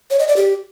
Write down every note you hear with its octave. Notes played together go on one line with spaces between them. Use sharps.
C#5
D#5
D5
G4